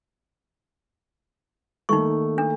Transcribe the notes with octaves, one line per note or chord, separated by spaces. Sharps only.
D#3 A3 A#3 D#4 C#6
D4